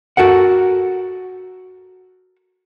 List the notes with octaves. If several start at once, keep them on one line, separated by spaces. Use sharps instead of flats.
F#4 A4 A#4 F#5